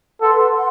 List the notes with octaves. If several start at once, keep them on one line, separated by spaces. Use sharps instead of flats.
A4 B4 F#5 C6
F#5 C6